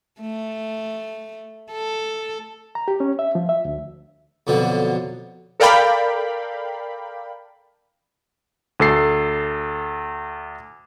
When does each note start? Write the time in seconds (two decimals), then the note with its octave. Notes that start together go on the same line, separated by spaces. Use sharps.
0.21 A3
1.72 A4
2.75 A#5
2.88 G4
3.00 C#4
3.19 E5
3.35 F3
3.49 E5
3.65 D2
4.47 F2 B2 D3 F#3
5.60 A4 A#4 D5 F5 G5 B5
8.80 D2 A4 C7